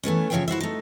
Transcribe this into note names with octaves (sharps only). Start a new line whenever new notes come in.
E3 A3 B3 C#4
C#3 F3 C#5 E5 F5 G5
E4 F#4 C5 E5
A3 D#4